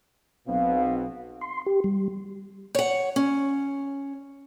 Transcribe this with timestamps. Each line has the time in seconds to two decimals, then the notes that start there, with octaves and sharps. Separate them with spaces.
0.48 B1 B2 C4 F5
1.41 C6
1.66 G4
1.84 G3
2.75 C#5 F#5
3.16 C#4